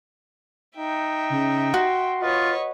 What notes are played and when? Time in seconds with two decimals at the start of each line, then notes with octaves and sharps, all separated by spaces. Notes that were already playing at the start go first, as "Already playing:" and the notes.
0.77 D#4 E5 G5
1.30 C#3
1.74 F#4 C6
2.22 F4 B4 C#5 D#5